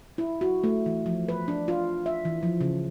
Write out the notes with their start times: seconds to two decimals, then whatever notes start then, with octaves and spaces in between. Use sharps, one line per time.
0.18 E4
0.41 F#4
0.64 A3
0.86 E3
1.06 F3
1.29 B4
1.48 D4
1.68 F4
2.06 E5
2.25 E3
2.43 F3
2.61 C#3